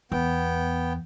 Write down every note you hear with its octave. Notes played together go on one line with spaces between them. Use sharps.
E2 B3 G5